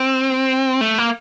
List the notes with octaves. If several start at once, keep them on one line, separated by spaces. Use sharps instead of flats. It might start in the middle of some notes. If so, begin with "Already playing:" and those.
Already playing: C4
A3
A#3